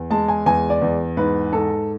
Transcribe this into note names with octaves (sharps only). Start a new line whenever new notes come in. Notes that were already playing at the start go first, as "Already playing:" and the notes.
Already playing: E2
G#3 A5
G#5
E2 G#5
D5
E2
G#2 B4
G#2 A4